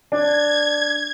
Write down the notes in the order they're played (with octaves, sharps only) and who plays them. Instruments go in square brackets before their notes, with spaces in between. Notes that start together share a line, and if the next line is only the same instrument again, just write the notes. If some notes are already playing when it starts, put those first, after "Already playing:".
[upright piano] D4 [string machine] G#6